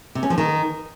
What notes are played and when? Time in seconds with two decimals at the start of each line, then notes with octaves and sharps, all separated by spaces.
0.15 C3
0.23 C#4
0.30 F3
0.38 D#3